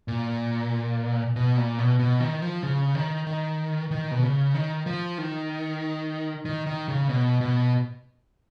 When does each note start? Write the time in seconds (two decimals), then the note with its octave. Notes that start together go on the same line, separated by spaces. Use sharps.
0.08 A#2
1.36 B2
1.57 A#2
1.78 B2
1.99 B2
2.20 D#3
2.42 F3
2.63 C#3
2.95 D#3
3.27 D#3
3.91 D#3
4.11 B2
4.22 C#3
4.54 D#3
4.86 F3
5.18 D#3
6.45 D#3
6.67 D#3
6.88 C#3
7.09 B2
7.41 B2